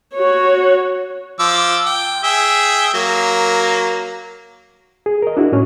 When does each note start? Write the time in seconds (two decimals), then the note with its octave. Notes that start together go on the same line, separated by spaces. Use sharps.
0.15 F#4 C#5
1.40 F3 D6 E6
1.86 G5
2.24 G#4 E5 G5
2.94 F#3 A#3
5.06 G#4
5.22 A#4 D#5
5.37 D4 E4 F#4
5.52 A2 C#4